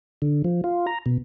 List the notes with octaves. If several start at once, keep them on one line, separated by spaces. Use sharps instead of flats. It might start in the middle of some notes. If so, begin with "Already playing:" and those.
D3
F3
F4
A#5
B2